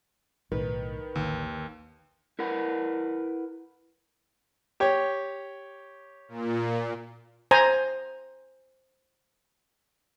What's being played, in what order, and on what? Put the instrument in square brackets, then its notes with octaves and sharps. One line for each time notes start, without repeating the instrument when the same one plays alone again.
[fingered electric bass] B1 A2 [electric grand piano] D#3 [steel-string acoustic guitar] B4
[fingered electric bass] A1 D3 D#3 [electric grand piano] D#2
[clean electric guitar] E4 A#4 B4 F#5
[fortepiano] G4 C#5
[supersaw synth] A#2
[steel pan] C5 G#5 A#5